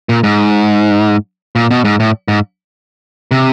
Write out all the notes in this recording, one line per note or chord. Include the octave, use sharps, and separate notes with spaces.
A#2
G#2
A#2
B2
G#2
A2
G#2
C3